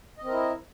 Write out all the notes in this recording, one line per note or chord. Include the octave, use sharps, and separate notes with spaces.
C4 E4 A#4 D#5